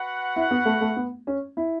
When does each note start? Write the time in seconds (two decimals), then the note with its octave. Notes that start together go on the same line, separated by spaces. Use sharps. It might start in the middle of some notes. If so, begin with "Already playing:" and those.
Already playing: F#4 B4 F#5
0.36 E4
0.51 B3
0.66 A3
0.81 A3
0.96 B3
1.27 C#4
1.57 E4